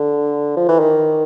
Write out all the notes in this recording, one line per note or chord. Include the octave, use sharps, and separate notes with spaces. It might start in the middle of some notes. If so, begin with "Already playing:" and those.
Already playing: D3
F3
E3
D#3